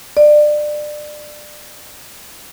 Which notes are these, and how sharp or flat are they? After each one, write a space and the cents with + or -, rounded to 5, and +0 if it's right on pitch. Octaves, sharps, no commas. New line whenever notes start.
D5 +25